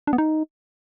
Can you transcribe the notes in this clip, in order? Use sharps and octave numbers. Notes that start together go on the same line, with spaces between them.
D4
B3
D#4